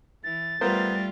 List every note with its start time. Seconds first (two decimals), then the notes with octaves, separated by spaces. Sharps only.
0.24 E3 A6
0.61 G3 A3 B3 F4 A#4 C5